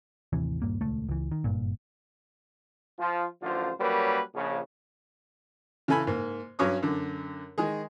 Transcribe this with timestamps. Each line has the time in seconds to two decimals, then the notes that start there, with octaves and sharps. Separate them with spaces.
0.33 A1 D#2 C3 E3
0.62 D#1 E2 G2 A#3
0.81 D#1 C#2 A3
1.09 C#2 E3
1.31 D#3
1.44 F#1 B1 G2 A#2
2.99 F3 F4
3.42 A1 F#2 D3 F3 F4 C5
3.80 F#3 G3 A#3 C#4 A#4 B4
4.35 A#1 C#3
5.88 C#3 E3 A4 G#5 B5
6.07 G#2 A#3
6.59 G2 F#3 C#4 C#5 D6 D#6
6.83 F#2 D3
7.58 D#3 G#3 G#4